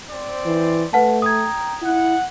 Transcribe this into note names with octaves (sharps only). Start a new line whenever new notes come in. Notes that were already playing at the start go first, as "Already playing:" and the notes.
C4 C5 D5
E3
A3 B4 F#5 A5
G5 A#5 D#6 G#6
E4 F#5